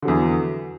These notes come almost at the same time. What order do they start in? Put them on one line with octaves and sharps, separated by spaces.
D3 F#3 E2